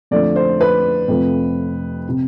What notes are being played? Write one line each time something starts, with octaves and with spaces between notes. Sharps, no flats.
F2 D3 F3 A3 D5
C5
B4
F2 C3 F3 A3
C3